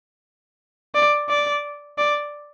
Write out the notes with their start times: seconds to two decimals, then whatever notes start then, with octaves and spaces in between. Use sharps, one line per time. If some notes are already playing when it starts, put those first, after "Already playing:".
0.95 D5
1.29 D5
1.98 D5